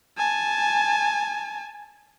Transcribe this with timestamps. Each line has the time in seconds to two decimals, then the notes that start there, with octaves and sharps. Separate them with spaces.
0.18 G#5 A5